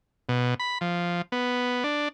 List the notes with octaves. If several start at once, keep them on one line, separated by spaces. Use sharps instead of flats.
B2
B5
F3
B3
D4